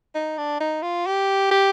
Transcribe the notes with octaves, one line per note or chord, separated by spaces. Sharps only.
D#4
D4
D#4
F4
G4
G4